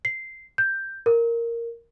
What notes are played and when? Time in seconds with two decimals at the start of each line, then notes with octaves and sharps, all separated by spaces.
0.05 C7
0.58 G6
1.06 A#4